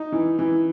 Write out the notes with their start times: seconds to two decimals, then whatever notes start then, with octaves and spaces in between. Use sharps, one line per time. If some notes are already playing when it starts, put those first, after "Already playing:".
Already playing: D#4
0.12 E3
0.39 E3